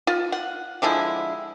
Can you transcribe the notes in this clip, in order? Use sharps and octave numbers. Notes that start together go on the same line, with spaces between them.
F4
F#5
D3 F3 G#3 E4